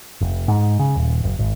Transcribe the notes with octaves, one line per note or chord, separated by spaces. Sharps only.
F1
G#2
C#3
D#1
F#1
G#1